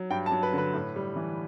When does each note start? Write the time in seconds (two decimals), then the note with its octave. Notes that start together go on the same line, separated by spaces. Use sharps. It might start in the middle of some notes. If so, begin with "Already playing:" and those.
Already playing: F#3
0.10 G2 G5
0.26 A5
0.32 F#3
0.43 B4
0.53 D3
0.58 B4
0.73 A2
0.96 G3
1.16 E3